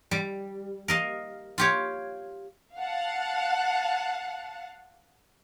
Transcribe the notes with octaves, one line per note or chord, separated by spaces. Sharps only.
G3
A#4 D#5 F5
F4 G4 C#5
F5 F#5 A5